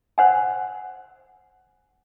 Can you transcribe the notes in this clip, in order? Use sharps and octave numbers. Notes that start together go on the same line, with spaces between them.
C5 F#5 G#5